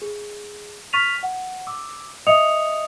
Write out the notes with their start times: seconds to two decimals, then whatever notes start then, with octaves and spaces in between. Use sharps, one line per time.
0.02 G#4
0.93 C#6 F6 A6 B6 D#7 F7
1.23 F#5
1.67 D6 E6
2.27 D#5 E5 D#6 C#7 F7